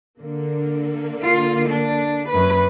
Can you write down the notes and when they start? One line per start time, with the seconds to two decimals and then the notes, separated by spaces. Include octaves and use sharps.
0.20 D3 A#3
1.23 F4
1.69 D4
2.29 F#2 B4